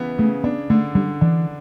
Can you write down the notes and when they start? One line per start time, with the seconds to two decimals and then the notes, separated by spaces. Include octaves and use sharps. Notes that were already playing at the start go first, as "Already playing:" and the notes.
Already playing: C#3 E3 B3
0.18 C#3 A3
0.44 B3 D4
0.70 D3 A3
0.95 D3 G3
1.21 E3 D4